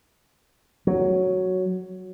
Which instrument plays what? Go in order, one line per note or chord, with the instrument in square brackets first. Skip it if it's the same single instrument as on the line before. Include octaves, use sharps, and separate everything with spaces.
[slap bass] F#3